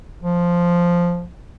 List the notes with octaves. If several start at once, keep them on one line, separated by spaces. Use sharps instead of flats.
F3